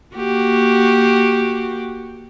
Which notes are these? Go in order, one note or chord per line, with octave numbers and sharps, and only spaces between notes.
A#3 F#4 G4